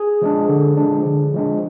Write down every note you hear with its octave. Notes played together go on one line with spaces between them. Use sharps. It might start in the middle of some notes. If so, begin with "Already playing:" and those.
Already playing: G#4
F3 G#3 D4
D3
F3 G#3 D4
D3
F3 G#3 D4